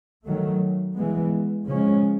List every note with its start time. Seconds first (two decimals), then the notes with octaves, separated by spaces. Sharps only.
0.25 D#3 F#3 A3
0.95 E3 G#3 B3
1.66 C#3 F3 G#3 C#4